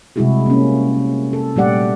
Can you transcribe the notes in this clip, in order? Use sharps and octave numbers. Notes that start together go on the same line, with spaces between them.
C3 G3 G#3 E4 F#4 G#4
A#3 C#4
A4
A#2 G3 A3 G4 D5 F#5